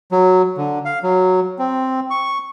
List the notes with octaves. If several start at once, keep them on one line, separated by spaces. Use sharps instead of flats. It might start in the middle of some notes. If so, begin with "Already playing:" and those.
F#3
D3
F5
F#3
C4
C#6